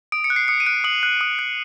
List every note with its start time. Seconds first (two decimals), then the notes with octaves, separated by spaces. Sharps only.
0.12 D#6 D7
0.24 C#7
0.30 F#6
0.36 C7
0.48 D#6 C#7
0.60 D#7
0.66 F#6 D7
0.84 D#6 F#7
1.03 F#6
1.21 D#6
1.39 F#6